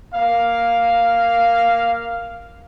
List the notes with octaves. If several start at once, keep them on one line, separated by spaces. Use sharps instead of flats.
A#3 F5